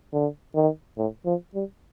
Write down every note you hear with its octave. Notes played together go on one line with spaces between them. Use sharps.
D3
D#3
A2
F3
G3